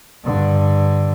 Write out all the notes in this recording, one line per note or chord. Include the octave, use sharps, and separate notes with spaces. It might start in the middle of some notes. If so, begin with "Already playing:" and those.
G2 D3